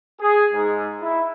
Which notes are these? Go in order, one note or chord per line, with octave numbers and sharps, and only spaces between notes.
G#4
G#2
E4